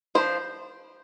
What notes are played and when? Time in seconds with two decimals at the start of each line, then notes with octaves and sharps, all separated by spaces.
0.15 F3 D4 C5